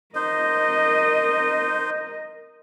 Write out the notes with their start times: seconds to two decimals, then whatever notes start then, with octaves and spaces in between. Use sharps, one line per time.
0.15 D#4 A#4 C5 D#5